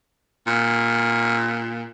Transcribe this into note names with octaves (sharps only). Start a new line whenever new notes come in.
A#2